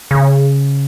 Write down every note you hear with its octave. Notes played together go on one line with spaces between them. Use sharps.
C#3